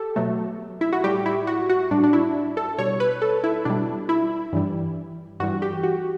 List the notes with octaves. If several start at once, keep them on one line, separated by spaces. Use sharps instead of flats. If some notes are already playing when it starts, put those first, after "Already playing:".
Already playing: G4 A4
B2 F#3 A3
E4
F#4
A2 G3 G4
E4
F#4
F#4
A2 G3 D4
D4
E4
A4
B2 G3 C#5
B4
A4
E4
B2 G3 D4
E4
G2 E3 G3
G2 E3 G3 F#4
G4
F#4